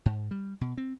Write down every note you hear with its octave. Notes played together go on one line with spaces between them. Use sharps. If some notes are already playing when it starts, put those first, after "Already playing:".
G#2
G3
B2
C4